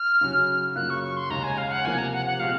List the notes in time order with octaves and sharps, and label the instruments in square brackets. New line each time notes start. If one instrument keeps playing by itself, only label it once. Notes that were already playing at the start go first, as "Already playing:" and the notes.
Already playing: [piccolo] F6
[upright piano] C#3 F#3 C#4 F#4
[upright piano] F#2 C#3 F#3 A#3 F4 [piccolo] F#6
[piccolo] C#6
C#6
C6
[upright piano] D#2 C#3 G#3 [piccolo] A#5
[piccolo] G#5
F5
F#5
[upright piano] C3 F3 A#3 [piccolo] G#5
[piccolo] A#5
F#5
F#5
[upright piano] A#2 G#3 C4 F#4 [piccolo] F5